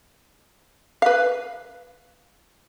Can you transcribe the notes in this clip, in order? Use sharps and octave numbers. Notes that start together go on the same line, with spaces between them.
B4 F5